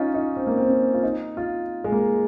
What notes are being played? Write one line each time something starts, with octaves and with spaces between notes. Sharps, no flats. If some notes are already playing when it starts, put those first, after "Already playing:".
Already playing: C#4 D#4 F4
D#4
C4
A#3
C4
C#4
F4
D#4
F4
G#3
A#3